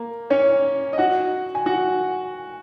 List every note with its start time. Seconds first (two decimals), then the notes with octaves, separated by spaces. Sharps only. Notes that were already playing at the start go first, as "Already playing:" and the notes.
Already playing: A#3
0.30 C#4 C#5
0.93 D#5
0.98 F#4 F#5
1.55 G#5
1.66 F#4 F#5